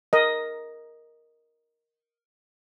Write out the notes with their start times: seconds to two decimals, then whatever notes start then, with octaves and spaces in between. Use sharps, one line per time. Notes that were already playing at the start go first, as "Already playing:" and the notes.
0.13 A#4 D#5